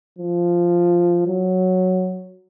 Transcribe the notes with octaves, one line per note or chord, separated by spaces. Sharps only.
F3
F#3